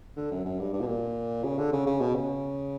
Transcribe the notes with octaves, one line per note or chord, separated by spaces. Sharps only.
D3
F#2
F#2
G2
G2
B2
A#2
C#3
D3
C#3
C#3
B2
C#3